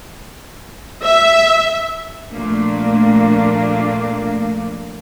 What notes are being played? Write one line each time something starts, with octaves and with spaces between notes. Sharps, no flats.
E5
A#2 F3 A3 A#3 D4